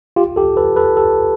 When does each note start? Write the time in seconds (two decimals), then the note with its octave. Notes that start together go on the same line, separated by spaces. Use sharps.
0.16 F4 G4
0.36 G4 A4
0.57 A4 B4
0.76 A4 B4
0.97 G4 A4